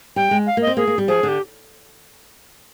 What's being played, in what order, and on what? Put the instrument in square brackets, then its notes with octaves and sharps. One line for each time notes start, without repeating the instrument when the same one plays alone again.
[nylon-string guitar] G3 [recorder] G5
[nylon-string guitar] G#3
[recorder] F5
[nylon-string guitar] A#3 [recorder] D#5
[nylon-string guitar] C4
[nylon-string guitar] A#3 [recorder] G#4
[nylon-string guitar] A#3
G3
[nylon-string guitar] F3 [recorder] G#4
[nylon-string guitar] D3
[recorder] G4